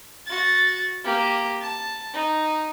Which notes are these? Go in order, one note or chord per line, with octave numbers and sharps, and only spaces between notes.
F#4 A6
A#3 G4
A5
D#4